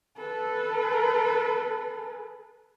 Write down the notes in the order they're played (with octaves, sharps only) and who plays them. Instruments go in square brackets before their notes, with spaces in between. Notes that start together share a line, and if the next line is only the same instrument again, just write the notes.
[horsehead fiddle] A4 B4